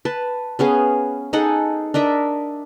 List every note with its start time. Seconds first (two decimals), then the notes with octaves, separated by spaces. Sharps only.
0.05 B4 A5
0.59 B3 C#4 G#4 F5
1.33 D#4 G#4 A4 F#5
1.94 D4 A#4 D#5 E5